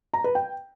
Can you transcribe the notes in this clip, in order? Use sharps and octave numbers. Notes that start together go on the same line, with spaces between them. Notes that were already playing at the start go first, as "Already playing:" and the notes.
A#5
B4
G5